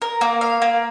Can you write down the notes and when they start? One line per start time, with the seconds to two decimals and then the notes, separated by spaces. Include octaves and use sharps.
0.02 A#4
0.21 A#3
0.41 F5
0.62 A#3